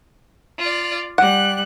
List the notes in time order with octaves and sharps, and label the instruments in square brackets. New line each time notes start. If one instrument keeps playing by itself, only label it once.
[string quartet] F4 D5
[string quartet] G3 F#6 [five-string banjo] F#5